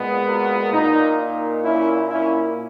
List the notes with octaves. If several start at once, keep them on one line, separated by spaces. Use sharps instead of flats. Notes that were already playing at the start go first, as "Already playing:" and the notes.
Already playing: A#2 G#3 B3
F#4 A#4
A#2 A#3 D#4
D#4
C#4 E4
C#4 E4